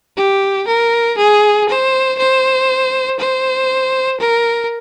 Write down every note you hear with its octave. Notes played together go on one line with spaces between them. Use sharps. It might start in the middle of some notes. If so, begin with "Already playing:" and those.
G4
A#4
G#4
C5
C5
C5
A#4